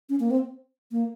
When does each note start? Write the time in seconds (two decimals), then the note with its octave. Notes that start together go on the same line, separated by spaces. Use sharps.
0.09 C#4
0.20 A#3
0.31 C4
0.92 A#3